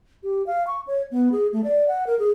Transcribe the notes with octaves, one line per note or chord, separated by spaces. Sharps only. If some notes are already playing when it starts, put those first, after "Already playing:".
G4
F5
C#6
C#5
B3
G#4
A3
D5
F#5
A#4
G#4